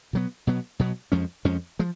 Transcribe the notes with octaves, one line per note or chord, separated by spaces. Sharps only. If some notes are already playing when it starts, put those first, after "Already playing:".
B2 F#3 B3
B2 F#3 B3
B2 F#3 B3
F2 F3 G#3 C#4
F2 F3 G#3 C#4
F3 G#3